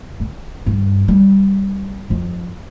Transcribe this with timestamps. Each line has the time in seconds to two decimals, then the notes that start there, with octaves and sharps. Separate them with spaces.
0.20 D3
0.66 G2
1.08 G3
2.10 F2